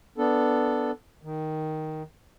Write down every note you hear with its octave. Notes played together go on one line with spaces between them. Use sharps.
B3 D4 A4
D#3